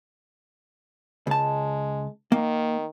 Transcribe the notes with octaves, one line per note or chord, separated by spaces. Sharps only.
C#2 G#3 A5
D#3 A#3